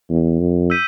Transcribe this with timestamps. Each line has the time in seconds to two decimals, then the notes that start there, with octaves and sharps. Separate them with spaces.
0.09 E2
0.40 F2
0.70 E6 G6 B6 D#7